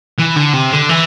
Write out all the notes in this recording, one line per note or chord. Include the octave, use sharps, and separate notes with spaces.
E3
D3
C3
D3
E3